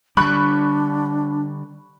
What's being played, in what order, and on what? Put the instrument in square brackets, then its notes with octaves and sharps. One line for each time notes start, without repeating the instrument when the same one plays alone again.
[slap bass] D3 G3 [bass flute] D4 [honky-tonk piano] B5 C#6 F#6